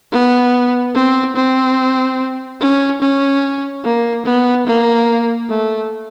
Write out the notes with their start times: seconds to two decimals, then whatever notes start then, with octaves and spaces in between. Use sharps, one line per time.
0.12 B3
0.95 C4
1.36 C4
2.61 C#4
3.02 C#4
3.84 A#3
4.25 B3
4.67 A#3
5.50 A3